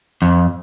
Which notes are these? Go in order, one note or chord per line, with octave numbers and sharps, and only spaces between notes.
F2